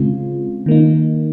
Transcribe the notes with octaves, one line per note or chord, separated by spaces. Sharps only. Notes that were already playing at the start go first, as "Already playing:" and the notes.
Already playing: C#3 G#3 C4 F4
D#3 A#3 D#4